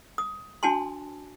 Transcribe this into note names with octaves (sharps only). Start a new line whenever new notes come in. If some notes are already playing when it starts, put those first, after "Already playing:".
D#6
D4 F#4 G#5 A5 C6